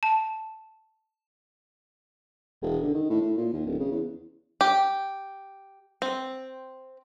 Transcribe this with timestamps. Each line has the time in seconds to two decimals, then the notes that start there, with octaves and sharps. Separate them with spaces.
0.03 A5
2.62 E1
2.83 D3
2.94 D#3
3.10 A2
3.21 A2
3.37 A#2
3.53 D#2
3.66 D1
3.79 C#3
3.92 E2
4.61 G4
6.02 C4